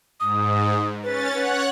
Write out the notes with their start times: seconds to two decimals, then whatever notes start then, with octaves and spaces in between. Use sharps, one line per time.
0.20 G#2 D#6
1.04 C#4 B4 A6
1.34 B4 C#5 F#5 F#6